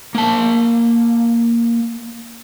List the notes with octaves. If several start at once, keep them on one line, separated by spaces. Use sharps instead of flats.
A#3 A5